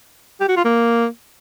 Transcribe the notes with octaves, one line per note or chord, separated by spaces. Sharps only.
G4
F#4
F4
A#3